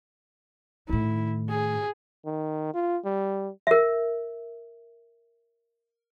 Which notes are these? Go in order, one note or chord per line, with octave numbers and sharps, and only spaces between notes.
A2 D#3 E4
G#4
D#3
F4
G3
A#4 E5